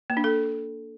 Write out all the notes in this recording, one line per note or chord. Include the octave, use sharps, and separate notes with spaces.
A#3
D4
A4